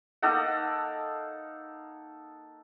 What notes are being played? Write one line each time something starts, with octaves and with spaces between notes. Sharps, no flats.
A#3 D#4 A4 F#5